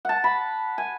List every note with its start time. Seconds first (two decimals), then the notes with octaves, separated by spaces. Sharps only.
0.05 F#5 A5
0.24 B5
0.78 G#5